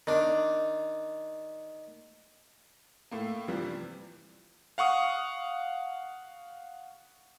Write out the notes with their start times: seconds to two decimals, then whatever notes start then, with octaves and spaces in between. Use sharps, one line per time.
0.07 D#3 D4
3.11 A2 A3 A#3
3.48 G2 C3 E3 F3 G3
4.78 F5 F#5 C#6 D#6